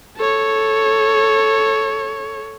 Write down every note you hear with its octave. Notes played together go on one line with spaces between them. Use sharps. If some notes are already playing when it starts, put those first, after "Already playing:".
A4 C#5